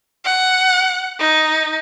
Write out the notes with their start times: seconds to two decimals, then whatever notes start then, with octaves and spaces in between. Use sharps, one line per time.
0.24 F#5
1.19 D#4